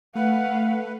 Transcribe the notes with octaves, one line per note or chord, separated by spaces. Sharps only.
A3 B4 F5 F#5